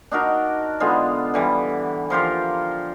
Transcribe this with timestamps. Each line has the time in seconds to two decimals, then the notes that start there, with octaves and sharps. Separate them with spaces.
0.11 D4 D#4 F#4 A#4
0.80 D3 G#3 B3 F4
1.34 D3 E3 G3
2.10 F3 F4 G4 A#4